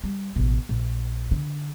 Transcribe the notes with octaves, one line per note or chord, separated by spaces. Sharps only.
G3
A1 B2
A#1
D3